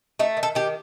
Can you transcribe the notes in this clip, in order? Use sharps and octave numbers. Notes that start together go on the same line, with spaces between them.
A3 D#4
D#3
A4
D#3 G4